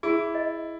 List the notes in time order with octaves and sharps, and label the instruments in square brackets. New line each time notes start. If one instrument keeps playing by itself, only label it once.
[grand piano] E4 [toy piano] G#4
[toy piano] D#5